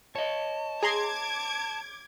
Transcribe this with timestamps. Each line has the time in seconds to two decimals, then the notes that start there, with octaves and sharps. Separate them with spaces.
0.16 C#5 D#5 A5
0.83 G#4 A#5 C6 D6 G#6